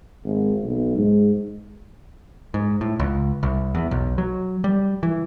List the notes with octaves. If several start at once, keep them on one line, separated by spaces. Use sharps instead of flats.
G#1
B1
G#2
G#2
A2
C#2
C2
E2
B1
F#3
G3
E3